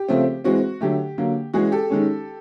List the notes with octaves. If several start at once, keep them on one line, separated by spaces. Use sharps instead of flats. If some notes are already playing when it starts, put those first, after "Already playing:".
Already playing: G4
C#3 F3 A3 C4
E3 G#3 C4 F#4
D3 F#3 A3 G4
D3 F#3 A#3
E3 G#3 C#4 F#4 G#4
G4 A4
D#3 G#3 C#4